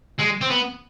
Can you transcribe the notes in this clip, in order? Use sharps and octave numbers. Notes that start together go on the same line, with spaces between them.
G#3
C4
B3